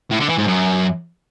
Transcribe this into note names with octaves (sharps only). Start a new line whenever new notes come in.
A2
D3
E3
G#2
F#2